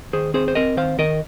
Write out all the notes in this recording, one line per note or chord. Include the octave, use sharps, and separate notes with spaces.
D#3 G#4 C5
C4 G#4 C5
C5
C4 A#4 D#5
D#3 C5 F5
D#3 A#4 D#5